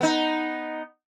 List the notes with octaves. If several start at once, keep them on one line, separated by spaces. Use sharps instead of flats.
B3 D#4